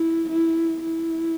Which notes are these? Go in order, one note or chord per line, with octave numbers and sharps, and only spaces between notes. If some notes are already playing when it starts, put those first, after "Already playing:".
Already playing: E4
E4
E4